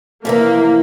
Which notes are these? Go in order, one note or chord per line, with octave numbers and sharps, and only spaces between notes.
F2 C3 E3 A#3